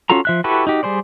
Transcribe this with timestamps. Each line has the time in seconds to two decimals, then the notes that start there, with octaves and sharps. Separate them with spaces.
0.10 C#4 F4 F#4 A4 A#5
0.25 F3 E5 F#6
0.44 E4 F#4 G4 A4 B4
0.67 D#4 F#4 G4
0.83 G3 G#4 C5 D5